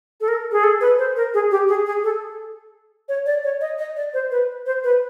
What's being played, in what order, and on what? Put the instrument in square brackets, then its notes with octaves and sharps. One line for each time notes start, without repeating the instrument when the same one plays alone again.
[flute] A4
A#4
G#4
A4
B4
C5
A#4
G#4
G4
G#4
G#4
A4
C#5
D5
C#5
D#5
D#5
D5
C5
B4
C5
B4